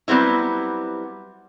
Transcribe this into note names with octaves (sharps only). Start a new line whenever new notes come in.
F#3 G3 B3 C4 E4